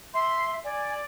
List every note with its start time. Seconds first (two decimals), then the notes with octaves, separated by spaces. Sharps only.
0.14 E5 C6
0.64 D5 G#5